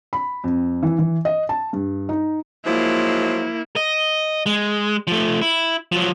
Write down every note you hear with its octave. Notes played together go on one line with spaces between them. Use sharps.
B5
F2
E3
E3
D#5
A5
G2
D#4
F3 F#3 G#3 A#3 E4
D#5
G#3
F3 A3
E4
F3 F#3